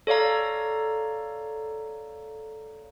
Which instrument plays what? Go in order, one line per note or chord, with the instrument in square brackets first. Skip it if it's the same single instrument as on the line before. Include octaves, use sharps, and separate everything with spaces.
[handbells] A4 C#5 D5 F5 A#5